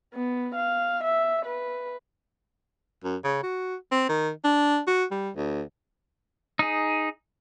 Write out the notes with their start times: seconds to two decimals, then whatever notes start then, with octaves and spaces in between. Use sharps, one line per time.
0.15 B3
0.55 F5
1.04 E5
1.46 B4
3.04 F#2
3.24 C#3
3.43 F#4
3.92 C4
4.09 D#3
4.44 D4
4.87 F#4
5.11 G3
5.36 D2
6.59 D#4 G#4